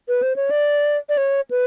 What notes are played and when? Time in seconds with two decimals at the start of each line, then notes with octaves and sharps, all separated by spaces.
0.08 B4
0.23 C5
0.36 C#5
0.51 D5
1.09 D5
1.17 C#5
1.51 B4